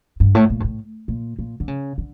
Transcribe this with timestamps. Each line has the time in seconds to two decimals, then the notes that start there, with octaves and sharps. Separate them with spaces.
0.20 G2
0.35 A2
0.50 A#2
0.60 G2
0.64 A2
1.08 A#2
1.39 A#2
1.60 D3
1.68 C#3
1.98 D3